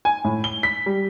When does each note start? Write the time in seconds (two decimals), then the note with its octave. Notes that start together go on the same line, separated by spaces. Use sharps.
0.05 G#5
0.24 A2
0.44 G7
0.63 B6
0.86 G3